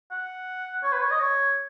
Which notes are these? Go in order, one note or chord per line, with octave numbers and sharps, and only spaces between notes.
F#5
C#5
B4
C#5
D#5
C#5